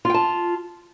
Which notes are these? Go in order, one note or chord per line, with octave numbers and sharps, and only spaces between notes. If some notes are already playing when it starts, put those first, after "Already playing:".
F4 G5 A5